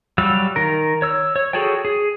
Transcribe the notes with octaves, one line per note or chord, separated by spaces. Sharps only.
F#3 G3 F5 E6
D#3 A#4
C#5 E6
C#5
F#4 G#4 A4 C#5 G5
G#4